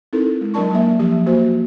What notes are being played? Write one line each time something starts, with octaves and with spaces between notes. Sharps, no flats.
C4 D#4 E4 A4 A#4
G#3
F#3 D4 A#4 D5 A5 C#6
F#3 A#3 E5
F3 G4 E5
A#3 F#4 C5